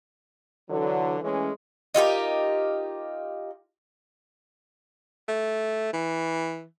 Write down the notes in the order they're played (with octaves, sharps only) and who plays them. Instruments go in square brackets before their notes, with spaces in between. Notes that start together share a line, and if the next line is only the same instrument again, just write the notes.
[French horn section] D3 E3 F#3
E3 G#3 A3 C#4
[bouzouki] D#4 F4 G4 A#4
[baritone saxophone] A3
E3